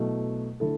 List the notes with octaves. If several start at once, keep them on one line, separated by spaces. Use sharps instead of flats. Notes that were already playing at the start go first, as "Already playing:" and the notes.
Already playing: B2 F#3 A3 E4
D3 A3 E4 A4